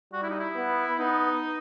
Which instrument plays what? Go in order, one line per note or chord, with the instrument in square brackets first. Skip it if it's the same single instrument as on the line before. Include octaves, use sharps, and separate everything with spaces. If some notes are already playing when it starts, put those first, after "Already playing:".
[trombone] G3 [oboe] F#4
[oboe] E4
D#4
E4
[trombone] B3
[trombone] B3 [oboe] D#4